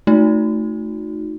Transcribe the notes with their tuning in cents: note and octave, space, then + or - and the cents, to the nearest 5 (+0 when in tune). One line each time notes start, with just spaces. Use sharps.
A3 +0 D#4 +0 F#4 -35